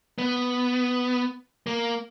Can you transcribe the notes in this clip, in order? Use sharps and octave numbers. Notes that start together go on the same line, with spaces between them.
B3
A#3